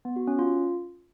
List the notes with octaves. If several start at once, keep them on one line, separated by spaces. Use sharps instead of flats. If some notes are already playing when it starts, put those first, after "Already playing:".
B3
F#4
C#4
F4